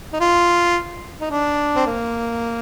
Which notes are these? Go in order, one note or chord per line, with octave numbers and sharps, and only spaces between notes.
D#4
F4
D#4
D4
C4
A#3